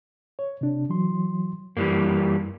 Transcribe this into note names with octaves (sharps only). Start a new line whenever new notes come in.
C#5
C3 D4
E3 F#3 C6
F#2 E3 G3 A#3